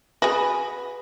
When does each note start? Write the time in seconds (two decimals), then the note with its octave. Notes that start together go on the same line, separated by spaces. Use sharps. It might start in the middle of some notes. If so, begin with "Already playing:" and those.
0.22 F#4 G#4 B4